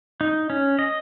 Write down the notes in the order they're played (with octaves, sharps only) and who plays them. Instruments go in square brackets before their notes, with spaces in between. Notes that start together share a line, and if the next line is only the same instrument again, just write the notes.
[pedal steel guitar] D#4
C#4
D#5